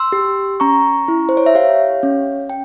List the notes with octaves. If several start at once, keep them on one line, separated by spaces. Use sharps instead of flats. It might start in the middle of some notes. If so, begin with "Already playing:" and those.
Already playing: C6 E6
G4
C#4 A#5 C#6
E4
C5
C#5
E5
G4 C#5 F5
C#4
G5